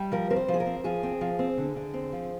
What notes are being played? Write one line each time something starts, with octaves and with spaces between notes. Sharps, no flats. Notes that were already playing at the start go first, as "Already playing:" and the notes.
Already playing: G3
F3 A#4
C4 A#4
C5
F3
G#4
A#4
C4
F3 G#4
C4
F3
C4
D3
D3
C4
F3